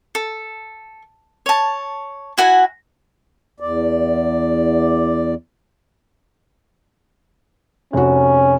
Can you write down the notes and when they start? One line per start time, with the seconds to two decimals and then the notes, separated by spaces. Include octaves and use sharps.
0.15 A4
1.46 C#5 A5
2.38 E4 F#4 F#5 G#5
3.60 E2 D5
7.93 F1 C#4 F#4